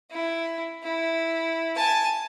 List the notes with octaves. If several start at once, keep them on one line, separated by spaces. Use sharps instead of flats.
E4
E4
G#5 A5